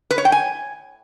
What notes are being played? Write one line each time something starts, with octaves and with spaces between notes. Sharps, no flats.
B4
C#5
G5
G#5